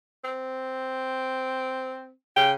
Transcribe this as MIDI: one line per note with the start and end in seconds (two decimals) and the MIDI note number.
0.24 2.11 60
2.37 2.55 49
2.37 2.52 79